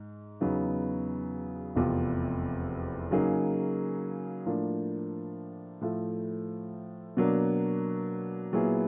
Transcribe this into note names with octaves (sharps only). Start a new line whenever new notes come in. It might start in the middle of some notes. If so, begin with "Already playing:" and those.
Already playing: G#2
E2 C#3 F#3 B3 D#4
F1 E2 C3 F3
C#3 F#3 A#3 D#4 G#4
A2 F3 A#3 D4
A2 F3 A3
B2 F#3 A#3 D4
A#2 F#3 B3 E4 G#4